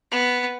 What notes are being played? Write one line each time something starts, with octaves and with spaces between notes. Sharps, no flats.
B3